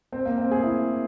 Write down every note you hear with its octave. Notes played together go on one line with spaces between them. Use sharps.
C4
A#3
C4
G#4
E4